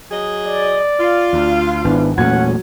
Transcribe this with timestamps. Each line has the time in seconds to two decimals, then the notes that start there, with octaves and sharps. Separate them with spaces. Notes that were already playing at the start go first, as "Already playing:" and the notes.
0.10 F#3 G#4 D#5
0.47 D5
0.99 F4
1.33 D2
1.84 G#1 B3 D4 E4
2.17 E1 A#2 F#3 A3 C#4 F#5 G#6